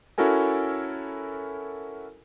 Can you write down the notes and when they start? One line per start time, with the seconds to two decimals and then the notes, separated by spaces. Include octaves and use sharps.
0.18 C#4 E4 F#4 A4 A#4 G#5